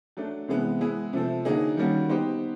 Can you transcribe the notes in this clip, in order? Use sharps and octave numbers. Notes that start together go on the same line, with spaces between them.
F#3 A3 D4
C3 E3 G#3 B3
G#3 B3 E4 G#4
C3 F3 A3 C4
D3 F#3 A#3 D#4 G#4
D#3 G3 A#3 C#4 F#4
B3 D#4 G4 C5